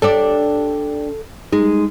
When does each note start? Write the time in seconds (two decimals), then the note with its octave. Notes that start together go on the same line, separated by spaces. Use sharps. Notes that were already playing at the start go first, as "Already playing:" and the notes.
0.02 D4 G4 A4 D5
1.53 G#3 D#4